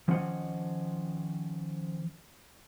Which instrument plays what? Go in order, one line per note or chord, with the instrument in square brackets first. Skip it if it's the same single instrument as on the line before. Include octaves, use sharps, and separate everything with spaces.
[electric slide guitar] D#3 F3 C#4 F4 D#5 F#5